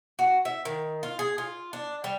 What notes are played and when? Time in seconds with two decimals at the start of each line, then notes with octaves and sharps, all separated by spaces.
0.19 F#4
0.45 E5
0.65 D#3
1.03 F4
1.19 G#4
1.38 F4
1.73 D4
2.04 G3